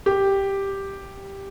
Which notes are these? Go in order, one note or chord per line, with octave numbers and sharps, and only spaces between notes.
G4